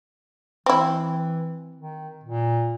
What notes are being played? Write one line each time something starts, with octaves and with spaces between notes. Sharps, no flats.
E3 C4 E4
D#3
A#2